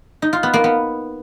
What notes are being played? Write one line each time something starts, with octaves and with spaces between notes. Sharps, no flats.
D#4
F4
B3
A#3
B3